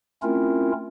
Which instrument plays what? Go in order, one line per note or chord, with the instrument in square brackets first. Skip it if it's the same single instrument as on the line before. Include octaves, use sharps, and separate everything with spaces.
[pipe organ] A3 C4 C#4 E4 F4 A#4